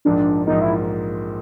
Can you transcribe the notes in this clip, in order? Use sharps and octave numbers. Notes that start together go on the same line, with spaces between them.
A#1 G#2 F3 A#3 D4
A#1 G#2 F3 A#3 D#4
E4